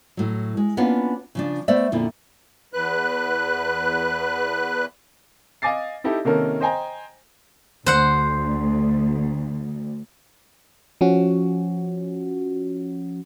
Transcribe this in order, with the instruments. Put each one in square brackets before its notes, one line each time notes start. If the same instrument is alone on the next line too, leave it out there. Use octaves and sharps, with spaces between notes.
[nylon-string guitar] A2 F#3
G#3
A#3 B3 C#4 D4 F4
C#3 F3 D4
A3 B3 C5 D5 E5
F2 A#2 D3 E4
[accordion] E2 B4 F#6
[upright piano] D#5 F5 G#5 D6 A6 C7
D#4 E4 G4 A4
C3 D#3 A#3 C#4 A4 A#4
C5 D#5 G5 G#5 A#5
[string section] D2 [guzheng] C5 F#5
[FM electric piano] F3 C#4 F#4